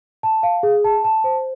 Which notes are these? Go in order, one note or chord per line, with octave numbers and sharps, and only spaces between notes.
A5
F5
G#4
A5
A5
C5